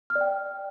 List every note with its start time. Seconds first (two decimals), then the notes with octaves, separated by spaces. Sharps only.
0.10 F6
0.15 D5
0.21 G5